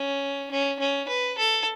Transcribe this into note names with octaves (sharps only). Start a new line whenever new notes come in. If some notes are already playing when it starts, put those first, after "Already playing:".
Already playing: C#4
C#4
C#4
B4
A4